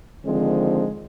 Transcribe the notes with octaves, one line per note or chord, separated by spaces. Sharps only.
D3 D#3 F3 G#3 C4